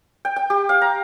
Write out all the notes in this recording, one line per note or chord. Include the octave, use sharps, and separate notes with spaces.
G5
G5
G4
F5
A#5